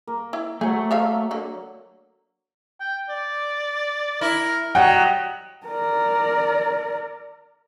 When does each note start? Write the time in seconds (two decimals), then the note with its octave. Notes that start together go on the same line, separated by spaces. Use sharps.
0.07 A#3
0.33 E4
0.61 F#3 A3 G#4 F#5
0.91 A4 E5 F5
1.31 D3 A#3
2.80 G5
3.09 D5
4.21 E4 A#4
4.75 F#3 G3 D#5 F#5 G5
5.67 A#4 D5